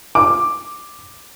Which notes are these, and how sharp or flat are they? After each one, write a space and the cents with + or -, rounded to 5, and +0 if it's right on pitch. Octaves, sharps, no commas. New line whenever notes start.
D6 +5